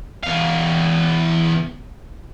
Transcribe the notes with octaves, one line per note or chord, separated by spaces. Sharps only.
E2 F5